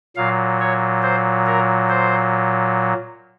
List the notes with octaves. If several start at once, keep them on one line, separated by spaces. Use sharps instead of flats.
A#2 F#3 F5
C#5
C5
A#4
C5